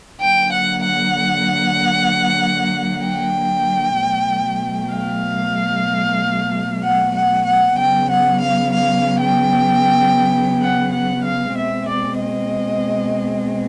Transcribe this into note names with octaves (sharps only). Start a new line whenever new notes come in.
D3 F#3 A#3 G5
F#5
F#5
G5
B2 F#3 A3
F5
F#5
F#5
F#5
C#3 F#3 B3 G5
F#5
F5
F5
G5
F#5
F#5
F5
B2 G#3 C4 E5
D5
D#5